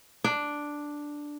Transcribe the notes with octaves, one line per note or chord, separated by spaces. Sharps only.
D4